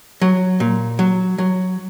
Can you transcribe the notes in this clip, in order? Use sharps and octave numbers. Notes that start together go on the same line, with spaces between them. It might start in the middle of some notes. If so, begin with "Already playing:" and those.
F#3
A#2
F#3
F#3